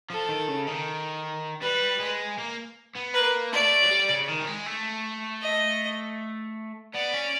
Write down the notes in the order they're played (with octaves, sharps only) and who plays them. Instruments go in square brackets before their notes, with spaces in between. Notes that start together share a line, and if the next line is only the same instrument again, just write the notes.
[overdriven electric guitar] F3 [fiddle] A4
[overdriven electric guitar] D#3
C#3
D#3
[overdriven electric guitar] G3 [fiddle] B4
[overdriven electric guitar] G#3
A#3
B3
[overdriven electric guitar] A#3 [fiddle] B4
[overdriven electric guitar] A3 [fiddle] D5
[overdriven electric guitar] F#3
G3
C#3
D#3
G3
G#3
A3
[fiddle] D#5
[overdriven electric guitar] B3 [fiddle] D5
[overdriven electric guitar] C#4